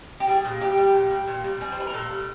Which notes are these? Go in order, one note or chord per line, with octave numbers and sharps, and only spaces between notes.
G4
G3 G#4
A#2
G3 G4
G3
A#2
G3
A#2
G3
G3 G#4
C5
G3 B4
A#4
A#2 A4
G3